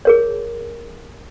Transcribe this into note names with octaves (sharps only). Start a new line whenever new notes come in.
G#4 A#4 C#5